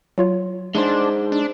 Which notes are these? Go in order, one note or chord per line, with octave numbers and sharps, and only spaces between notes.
F#3 F4 C#5
G#3 D4 D#4 C5
D4